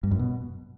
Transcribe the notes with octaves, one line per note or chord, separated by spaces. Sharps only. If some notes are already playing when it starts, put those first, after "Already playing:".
G2
F#2
B2